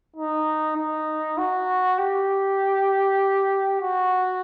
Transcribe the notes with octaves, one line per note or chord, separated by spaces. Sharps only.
D#4
D#4
F#4
G4
F#4